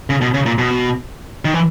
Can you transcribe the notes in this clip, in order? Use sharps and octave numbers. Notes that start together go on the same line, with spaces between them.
C#3
B2
C#3
A#2
B2
D#3
E3